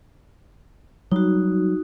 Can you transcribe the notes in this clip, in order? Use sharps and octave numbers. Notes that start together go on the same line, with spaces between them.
F#3 G3 D#4 F#4